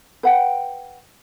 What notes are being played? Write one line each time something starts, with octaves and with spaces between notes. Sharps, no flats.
B4 F#5 G5